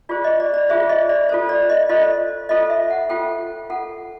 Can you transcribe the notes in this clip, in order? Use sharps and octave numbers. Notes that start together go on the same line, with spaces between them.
F4 G#4 C5 D5
D#5
D5
D5
F4 G#4 C5 E5
D#5
D5
F4 A4 C5
D5
D#5
F4 A4 C5 D#5
F4 A4 C5 D#5
E5
F#5
F4 A4 C5 G5
F4 A4 F#5